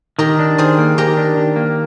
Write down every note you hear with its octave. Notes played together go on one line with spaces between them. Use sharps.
D#3 G4 A#4
D4
D#3 G#4 C5
A#3
D#3 G4 A#4
D4
D#3
A#3